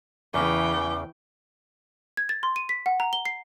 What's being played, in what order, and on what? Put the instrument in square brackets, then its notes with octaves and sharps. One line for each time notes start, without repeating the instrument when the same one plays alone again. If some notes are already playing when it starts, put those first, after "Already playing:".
[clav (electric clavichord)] E2 C#3 [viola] E3 G5 [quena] D6
[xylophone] G#6
A6
C6
D#7
B6
F#5
A#5
G7
C7